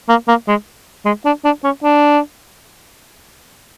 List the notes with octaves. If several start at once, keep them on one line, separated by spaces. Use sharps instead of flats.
A#3
A#3
G#3
G#3
D4
D4
C#4
D4